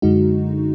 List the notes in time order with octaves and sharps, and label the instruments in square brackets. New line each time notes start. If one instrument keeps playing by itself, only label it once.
[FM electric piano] F#2 D3 G#3 D#4 F#4